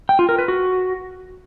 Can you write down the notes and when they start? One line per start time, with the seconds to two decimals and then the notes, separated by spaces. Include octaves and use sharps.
0.09 G5
0.19 F4
0.29 A#4
0.39 B4
0.48 F#4